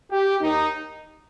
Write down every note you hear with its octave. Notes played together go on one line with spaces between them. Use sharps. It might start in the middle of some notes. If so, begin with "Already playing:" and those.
G4
D#2 D#3 D#4